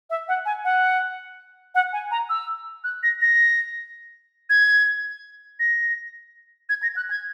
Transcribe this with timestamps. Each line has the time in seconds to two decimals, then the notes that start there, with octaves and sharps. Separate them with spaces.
0.10 E5
0.28 F#5
0.45 G#5
0.65 F#5
1.75 F#5
1.93 G#5
2.11 A#5
2.30 E6
2.84 F#6
3.03 A#6
3.21 A#6
4.50 G#6
5.59 A#6
6.69 G#6
6.83 A#6
6.96 F#6
7.11 G#6